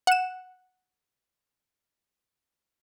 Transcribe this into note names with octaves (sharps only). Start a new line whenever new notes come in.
F#5 E7